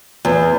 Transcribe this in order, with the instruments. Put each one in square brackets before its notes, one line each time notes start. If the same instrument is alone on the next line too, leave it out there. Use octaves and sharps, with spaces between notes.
[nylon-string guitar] E2